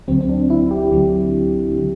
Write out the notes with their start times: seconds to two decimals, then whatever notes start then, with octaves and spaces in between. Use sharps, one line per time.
0.08 D2 D3 F#3 C4
0.21 C4
0.29 D4
0.50 E4
0.71 G4
0.92 D2 D3 F#3
1.78 D3 F#3